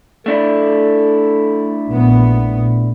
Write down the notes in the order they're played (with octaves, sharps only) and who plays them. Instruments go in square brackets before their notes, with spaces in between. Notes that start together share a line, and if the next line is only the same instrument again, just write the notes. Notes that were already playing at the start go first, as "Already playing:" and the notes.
[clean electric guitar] A3 D4 E4 [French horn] A4
[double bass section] A#1 B3